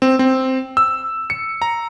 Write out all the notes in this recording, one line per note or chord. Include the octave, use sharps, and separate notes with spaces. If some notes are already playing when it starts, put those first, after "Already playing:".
C4
C4
E6
C#7
A#5